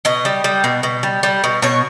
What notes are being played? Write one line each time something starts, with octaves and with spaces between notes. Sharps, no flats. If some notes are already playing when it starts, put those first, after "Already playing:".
B2 D#5
G3
G3
B2
B2
G3
G3
B2
B2 C#5